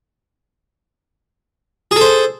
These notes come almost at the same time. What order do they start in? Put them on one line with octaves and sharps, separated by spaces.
G#4 A4 C5